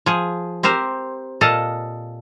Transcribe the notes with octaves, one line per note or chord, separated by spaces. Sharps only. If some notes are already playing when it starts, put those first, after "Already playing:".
F3 G#4
C4 G4 A#4 C5
A#2 A4 D#5 F5 A5